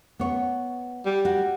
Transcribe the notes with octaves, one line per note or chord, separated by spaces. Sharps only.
B3 C#5
G3
F#4